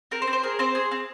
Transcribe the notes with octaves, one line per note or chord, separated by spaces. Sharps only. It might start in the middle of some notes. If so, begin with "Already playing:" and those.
C4 A#4
C5
C4
C5
G#4 A#4
C4 C5
G#4
C4